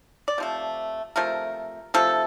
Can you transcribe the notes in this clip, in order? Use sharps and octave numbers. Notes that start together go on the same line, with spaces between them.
D5
C3 F3 A3
C3 F3 A3 A#4
C3 F3 A3 A4